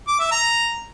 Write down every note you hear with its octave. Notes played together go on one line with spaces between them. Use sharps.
D6
E5
A#5